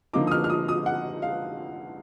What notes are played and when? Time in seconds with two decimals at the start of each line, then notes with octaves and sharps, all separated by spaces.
0.13 D3 F3 A#3 D#4 D6
0.27 D#6
0.31 F6
0.44 F6
0.50 D#6
0.68 D#6
0.86 F#5
1.22 F5